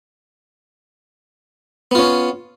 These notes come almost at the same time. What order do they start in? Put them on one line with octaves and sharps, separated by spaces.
B3 F4 C#4